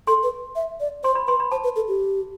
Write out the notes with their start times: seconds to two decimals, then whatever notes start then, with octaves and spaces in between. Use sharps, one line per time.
0.07 A4 C6
0.23 B4
0.56 E5
0.80 D5
1.04 C5 C6
1.15 B5
1.27 B4 C6
1.40 B5
1.51 C5 A5
1.64 B4
1.76 A4
1.88 G4